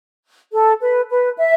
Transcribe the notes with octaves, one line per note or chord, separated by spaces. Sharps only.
A4
B4
B4
E5